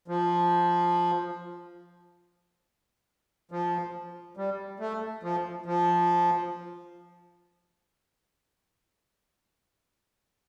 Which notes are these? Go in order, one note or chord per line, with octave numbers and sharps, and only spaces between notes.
F3
F3
G3
A3
F3
F3